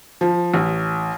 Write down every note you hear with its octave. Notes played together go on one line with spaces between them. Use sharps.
F3
A1